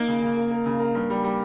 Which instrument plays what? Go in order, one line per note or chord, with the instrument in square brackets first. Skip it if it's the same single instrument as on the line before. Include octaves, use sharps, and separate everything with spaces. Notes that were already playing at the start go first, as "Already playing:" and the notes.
Already playing: [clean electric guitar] A#3 [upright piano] D#4 A#4
[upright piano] C#3
C#3
A#4
A#4
C#3
A#4
G2
G3
G3